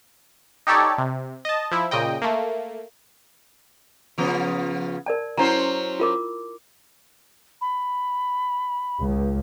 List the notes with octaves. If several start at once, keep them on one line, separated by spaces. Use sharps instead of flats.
D#4 G4 A4 C#5 D5
C3
D#5 A5
F3 E4
A#2 C#3 D#5 G5
A3 A#3
C#3 F3 B3
A#4 D5 A5
F#3 C#4 E4 C5 A5 A#5
F4 A#4 D6
B5
C#2